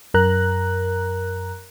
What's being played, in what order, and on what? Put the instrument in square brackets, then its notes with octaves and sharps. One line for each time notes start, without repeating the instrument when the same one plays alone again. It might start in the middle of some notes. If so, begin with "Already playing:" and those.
[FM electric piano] F#2 A#4 A#5 F#6